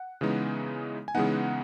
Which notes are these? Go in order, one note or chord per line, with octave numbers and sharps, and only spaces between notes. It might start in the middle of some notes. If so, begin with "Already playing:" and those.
Already playing: F#5
C#3 E3 G#3 B3 D#4
G#5
C#3 E3 G#3 B3 D#4 F#5